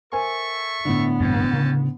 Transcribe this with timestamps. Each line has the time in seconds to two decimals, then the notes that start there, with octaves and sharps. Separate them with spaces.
0.12 A4 A#4 C5 E5 G#5 C#6
0.85 A2 D3 B3
1.20 E1 G2 C4 C#4 G5 A5
1.53 C#3